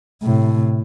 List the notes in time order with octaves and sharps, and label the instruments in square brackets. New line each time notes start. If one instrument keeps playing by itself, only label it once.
[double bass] A2 C3